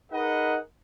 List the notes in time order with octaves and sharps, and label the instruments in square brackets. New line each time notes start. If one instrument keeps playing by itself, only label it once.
[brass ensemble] D#4 G#4 A#4 B4 D#5 F#5